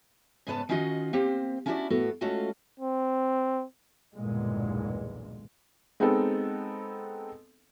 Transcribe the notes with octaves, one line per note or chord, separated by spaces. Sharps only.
G#2 C#3 B3 B4 C#5 A5
D#3 C#4 D#4 F4 F#4 D#5
A#3 C4 G4 C5
C#4 D4 E4 F#4 C#5 D5
A2 B3 F#4 A4
G#3 A3 C#4 F4 F#4 A4
C4
B1 E2 G2 A#2 D3 G#3
G#3 B3 C4 D#4 A4